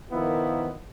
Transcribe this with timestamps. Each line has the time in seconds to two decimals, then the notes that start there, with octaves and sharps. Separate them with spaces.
0.12 D#3 F3 A#3 B3 E4